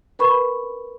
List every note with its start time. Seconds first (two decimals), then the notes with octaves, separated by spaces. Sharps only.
0.19 A#4 B4 B5 C#6